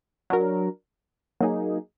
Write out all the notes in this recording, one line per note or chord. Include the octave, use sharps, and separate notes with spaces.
F#3 D4 F#4 A#4
F#3 A#3 D#4 G#4